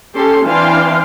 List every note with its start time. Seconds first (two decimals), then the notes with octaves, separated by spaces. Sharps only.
0.14 C#4 G4 A4 C6
0.45 E3 C4 D4 F5 G5 C6